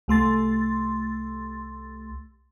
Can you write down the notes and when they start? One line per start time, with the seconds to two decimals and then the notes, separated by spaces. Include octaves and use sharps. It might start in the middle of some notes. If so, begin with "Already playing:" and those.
0.08 C2 A3 C6 A6